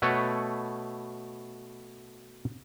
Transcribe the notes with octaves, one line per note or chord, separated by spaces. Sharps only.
B2 A3 A4 B4 C#5